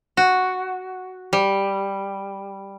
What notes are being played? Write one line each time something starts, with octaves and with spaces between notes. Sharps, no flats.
F#4
G3